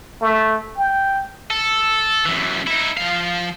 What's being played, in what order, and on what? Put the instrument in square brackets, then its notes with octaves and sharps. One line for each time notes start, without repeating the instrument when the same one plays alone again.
[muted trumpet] A3
G5
[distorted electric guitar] A4
F#2 E3
D#4 E4
F3 F5